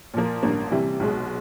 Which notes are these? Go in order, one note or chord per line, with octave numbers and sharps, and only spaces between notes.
A#2 F3 A#3
A1 G2 D3 F3 A#3
C3 E3 G3
B1 B2 G#3